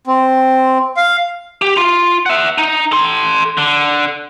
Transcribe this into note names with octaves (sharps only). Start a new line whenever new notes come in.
C4
F5
G4
F4
E5 F#5
D#4
A4 C6
D3